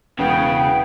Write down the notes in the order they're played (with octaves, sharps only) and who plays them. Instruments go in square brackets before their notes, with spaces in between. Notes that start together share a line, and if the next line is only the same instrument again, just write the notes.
[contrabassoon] E1 [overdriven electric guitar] C#3 [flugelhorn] B3 [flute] G5